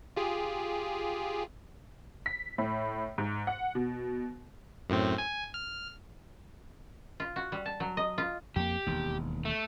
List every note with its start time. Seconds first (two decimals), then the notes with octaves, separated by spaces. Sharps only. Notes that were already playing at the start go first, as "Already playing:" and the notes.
0.16 F4 G4 G#4
2.26 B6
2.58 A2
3.18 G#2
3.47 F#5
3.75 B2
4.90 F#2 A2 C4
5.18 G#5
5.54 F6
7.20 F4
7.36 F#4
7.52 G3
7.66 A5
7.80 F#3
7.97 D#5
8.18 F4
8.56 F2 A#3 G4
8.86 E1 D#2
9.45 A3